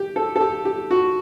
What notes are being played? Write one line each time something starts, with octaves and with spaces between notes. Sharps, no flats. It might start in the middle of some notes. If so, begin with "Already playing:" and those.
Already playing: G4
A4
A4
G4
G4
F#4